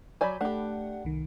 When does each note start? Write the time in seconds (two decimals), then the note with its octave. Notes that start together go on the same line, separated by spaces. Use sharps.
0.21 F#3 D5 G#5 B5 G6
0.41 A3 D4 G4 F#5
1.04 C2 D#3